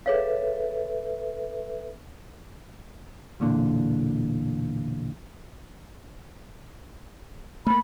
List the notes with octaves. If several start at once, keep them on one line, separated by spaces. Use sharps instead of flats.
G#4 A4 B4 C#5 E5 F5
B1 E2 A#2 D3
A3 A#3 B5